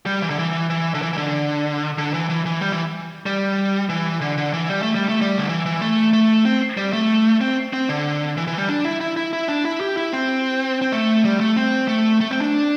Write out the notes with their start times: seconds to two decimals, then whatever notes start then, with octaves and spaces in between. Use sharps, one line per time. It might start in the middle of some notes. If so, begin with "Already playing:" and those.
0.06 G3
0.22 E3
0.30 D3
0.39 E3
0.70 E3
0.94 D3
1.02 E3
1.13 E3
1.17 D3
1.98 D3
2.14 E3
2.30 E3
2.46 E3
2.61 G3
2.72 E3
3.26 G3
3.89 E3
4.21 D3
4.38 D3
4.53 E3
4.69 G3
4.82 A3
4.95 G3
5.09 A3
5.21 G3
5.38 D3
5.49 E3
5.66 E3
5.81 A3
6.13 A3
6.45 C4
6.77 G3
6.93 A3
7.41 C4
7.73 C4
7.89 D3
8.37 E3
8.47 E3
8.58 G3
8.69 D4
8.85 E4
9.01 E4
9.17 E4
9.33 E4
9.48 D4
9.65 E4
9.81 G4
9.97 E4
10.13 C4
10.82 C4
10.92 A3
11.25 G3
11.40 A3
11.56 C4
11.88 A3
12.21 A3
12.31 C4
12.41 D4